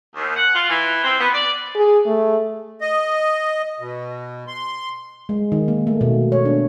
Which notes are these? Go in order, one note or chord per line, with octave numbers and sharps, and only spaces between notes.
D#2
F#5
F4
E3
C4
B3
D5
G#4
A3
D#5
B2
C6
G#3
D#3
A#3
A3
B2
C#5
D4